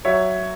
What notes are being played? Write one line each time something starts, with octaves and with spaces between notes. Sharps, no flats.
F#3 C#5 E5